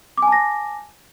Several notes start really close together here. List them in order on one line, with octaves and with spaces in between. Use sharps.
D6 G#5 A5 A#6